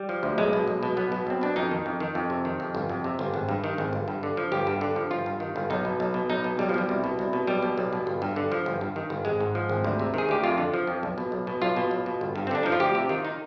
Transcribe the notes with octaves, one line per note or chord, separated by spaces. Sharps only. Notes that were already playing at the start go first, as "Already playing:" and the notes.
Already playing: G3
F3
D2
B1 G#3
B2
B1
B2
B1 B3
B2
B1 C4
B2 D4
F2 D#4
D#3
F2
D#3
F2
C3
D#3
F2
G1
F2
C3
G1
G#1
G2
D#3
G#1
G1
G2
D3
F3
G1 G4
G2
D3
F3
G1 F4
G2
D#3
G1
B1 D#4
B2
B1
B2
B1 D#4
B2
B1 G3
F3
B2 G3
C2
B2
C2
B2
B1 G3
B2
B1
B2
G1
G2
D3
F3
G1
G2
D#3
G1
G#1 G#3
G#2
F3
G#1
D2
C3
D#3 G#4
D2 G4
F2 F4
D3
F3
F2
B1
B2
B1
B2
B1 F4
B2
B1
B2
G1
G2
C4
D3 D4
F3 D#4
F4
D2 G4
C3 G4
D#3 F4
D#4